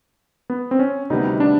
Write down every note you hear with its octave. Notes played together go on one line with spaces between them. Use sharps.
B3
C4
C#4
D2 C3 D#3 G3 B3 D#4
D4